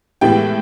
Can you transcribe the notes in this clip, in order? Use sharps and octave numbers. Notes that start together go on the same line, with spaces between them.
A2 E3 G#3 B3 G4 G5